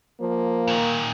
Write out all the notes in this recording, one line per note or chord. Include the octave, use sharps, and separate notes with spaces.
F3 A#3
A#2 D#3